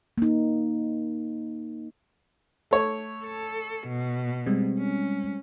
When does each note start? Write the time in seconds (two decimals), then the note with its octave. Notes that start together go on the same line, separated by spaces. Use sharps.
0.18 A#3 D#4
2.71 A3 C#5
3.23 A4
3.87 B2
4.46 G3 G#3 C4
4.78 C#4